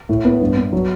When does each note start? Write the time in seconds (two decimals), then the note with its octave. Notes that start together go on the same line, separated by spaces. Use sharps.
0.09 A2
0.25 B3
0.41 G2
0.57 B3
0.73 F#3